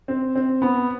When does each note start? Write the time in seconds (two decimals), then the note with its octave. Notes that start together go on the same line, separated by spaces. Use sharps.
0.08 C4
0.35 C4
0.62 B3